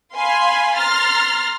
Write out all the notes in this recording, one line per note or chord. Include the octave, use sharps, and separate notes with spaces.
F5 G#5 B5 C6
A#5 C6 F6 A6